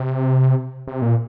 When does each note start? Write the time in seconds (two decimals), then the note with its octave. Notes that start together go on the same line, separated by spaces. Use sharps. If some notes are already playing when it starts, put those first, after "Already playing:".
Already playing: C3
0.88 C3
1.02 A#2